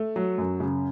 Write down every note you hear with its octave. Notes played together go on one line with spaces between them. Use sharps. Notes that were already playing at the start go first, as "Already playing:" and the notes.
Already playing: A3
F#3
F#2
C#3